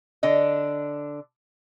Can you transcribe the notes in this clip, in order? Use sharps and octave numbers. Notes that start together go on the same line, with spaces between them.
D3 D4 D#5